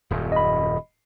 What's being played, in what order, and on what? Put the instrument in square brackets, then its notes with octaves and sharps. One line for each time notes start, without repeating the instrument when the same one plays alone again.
[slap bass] D#1 F#2
[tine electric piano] D#5 B5